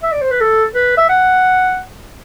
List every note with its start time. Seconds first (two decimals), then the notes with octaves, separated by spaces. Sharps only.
0.03 E5
0.12 D5
0.21 C5
0.31 B4
0.41 A4
0.75 B4
0.97 E5
1.09 F#5